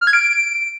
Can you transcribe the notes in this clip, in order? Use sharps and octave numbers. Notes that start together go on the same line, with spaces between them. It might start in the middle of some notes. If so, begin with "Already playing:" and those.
F6
G#6
D7